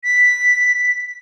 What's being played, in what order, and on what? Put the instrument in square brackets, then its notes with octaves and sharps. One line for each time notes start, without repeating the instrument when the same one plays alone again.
[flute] B6